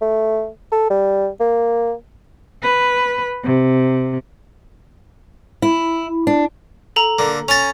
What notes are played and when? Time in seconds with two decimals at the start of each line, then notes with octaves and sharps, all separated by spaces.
0.01 A3
0.72 A4
0.90 G3
1.40 A#3
2.63 B4
3.44 C3
5.62 E4
6.27 D4
6.96 A4 A#5
7.19 D3 A#3
7.48 C#4 G#5 A#5 A6 F7